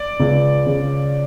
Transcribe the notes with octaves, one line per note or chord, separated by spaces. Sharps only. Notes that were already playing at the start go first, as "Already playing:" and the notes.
Already playing: D5
C#2
C#3